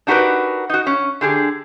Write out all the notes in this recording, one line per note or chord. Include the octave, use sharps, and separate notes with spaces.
D4 D#4 F#4 G4 A#4 B4
D#4 F#4
C#4
D3 G4 G#4